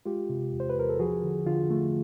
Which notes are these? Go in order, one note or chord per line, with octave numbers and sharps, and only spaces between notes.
G#3 F4 G4
C3
E2
C5
B4
E2 A#4
A4
F3 F#4 G#4
D3
D3 F4
A3